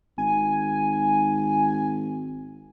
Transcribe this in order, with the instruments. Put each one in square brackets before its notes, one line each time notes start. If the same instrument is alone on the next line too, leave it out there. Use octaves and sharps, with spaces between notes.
[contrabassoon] G#1 [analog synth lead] G#5